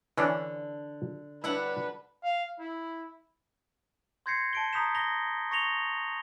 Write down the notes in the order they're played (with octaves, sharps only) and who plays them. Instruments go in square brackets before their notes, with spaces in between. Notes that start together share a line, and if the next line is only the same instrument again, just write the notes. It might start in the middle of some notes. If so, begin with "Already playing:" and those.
[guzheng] D3 [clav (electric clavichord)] E3 C#4 D4
[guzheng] G3 D4 F#5 [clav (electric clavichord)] E4 [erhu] B4
[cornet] F5
E4
[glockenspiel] C6 G6 G#6 A#6 C7 C#7
A5 D7 G7
A#5 B5 D#6 G6 B6 E7
B5 A#6 G7
C#6 A#6 C#7 F7 G7